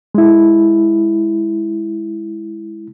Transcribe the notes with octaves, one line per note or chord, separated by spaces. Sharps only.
G#3 E4